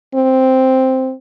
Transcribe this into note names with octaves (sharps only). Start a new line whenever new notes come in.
C4